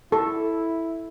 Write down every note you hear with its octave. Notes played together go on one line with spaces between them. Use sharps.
E4 A4